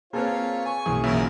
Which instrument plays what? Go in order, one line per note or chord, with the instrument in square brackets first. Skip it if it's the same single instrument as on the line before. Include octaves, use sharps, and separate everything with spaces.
[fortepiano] A#3 C4 B4 [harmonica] F4 C#5 [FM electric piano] G#4 A5 F6
[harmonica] G#5 C#6
[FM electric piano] B1 E3 A#3 [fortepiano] F#2 [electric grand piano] G#4
[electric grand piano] G1 C#3 E5 [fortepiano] A#2 [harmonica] F#3 C#4 A#4